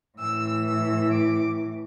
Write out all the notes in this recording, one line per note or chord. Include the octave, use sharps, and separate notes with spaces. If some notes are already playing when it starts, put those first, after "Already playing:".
A2 E3 E6
E6
D6